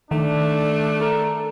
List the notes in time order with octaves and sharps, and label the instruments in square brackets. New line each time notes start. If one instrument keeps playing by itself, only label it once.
[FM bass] D#3 [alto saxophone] A3 [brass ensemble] D4
[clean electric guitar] A4 A#4